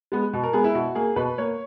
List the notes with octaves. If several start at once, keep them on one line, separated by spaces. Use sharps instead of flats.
G#3 B3
B2
A#4
G#3 B3 G#4
E4
B2 F#4
A#3 G#4
B2 B4
A#3 C#5